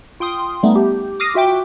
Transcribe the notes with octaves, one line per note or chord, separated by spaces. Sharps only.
F4 G5 C6 D#6
G3 A3 B3 D#4
G4
D6 D#6 F6 A#6 C7 D#7
F4 F#4 E5 G5 D6